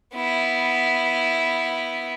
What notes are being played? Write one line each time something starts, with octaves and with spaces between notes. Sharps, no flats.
B3 E4